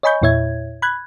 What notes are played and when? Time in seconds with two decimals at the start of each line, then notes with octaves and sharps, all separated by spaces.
0.03 C#5 D#5 G#5 B5 C#6 G6
0.22 E2 A#2 E4 C#5 E5 G#6
0.82 B5 F#6 G#6